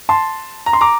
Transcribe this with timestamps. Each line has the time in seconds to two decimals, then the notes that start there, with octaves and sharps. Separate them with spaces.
0.09 A5 C6
0.66 A#5
0.73 C6
0.81 A#5 D6